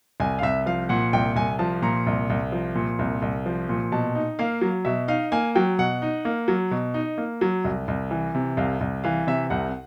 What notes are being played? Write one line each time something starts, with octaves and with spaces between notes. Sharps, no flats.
C2 G#5
F5
C2 E5
F3 F5
A#2 F#5
C2 G5
C2 G#5
F3 A5
A#2 A#5
C2
C2
F3
A#2
C2
C2
F3
A#2
B2 A5
D#4
A#3 F5
F#3
B2 E5
D#4 F5
A#3 G#5
F#3 G5
B2 F#5
D#4
A#3
F#3
B2
D#4
A#3
F#3
C2
C2
E3
C3
C2 F5
C2
E3 F5
C3 E5
C2 F#5